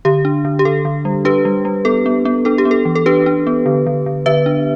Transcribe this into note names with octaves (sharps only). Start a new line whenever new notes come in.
D3 G4
D4
D3
G4
D3 A4
D3
G3
D4 G4 B4
G3
G3
B3 A4
B3
B3
D4 A4
G4
B3
A4
E3
A4
D4 G4 B4
D4
B3
D3
D3
D3
D3 B4 E5
D4